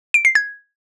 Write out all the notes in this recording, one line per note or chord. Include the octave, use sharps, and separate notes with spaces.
D7
C7
G#6